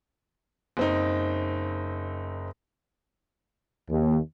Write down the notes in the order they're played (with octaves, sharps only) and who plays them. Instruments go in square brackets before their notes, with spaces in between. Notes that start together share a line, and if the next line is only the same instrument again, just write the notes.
[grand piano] F#1 C4 D#4
[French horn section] D#2